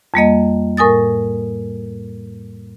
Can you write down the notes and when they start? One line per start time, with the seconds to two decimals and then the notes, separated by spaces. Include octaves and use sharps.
0.14 F2 G3 A#3 D#5
0.77 A2 A#4 G#5 D#6 A6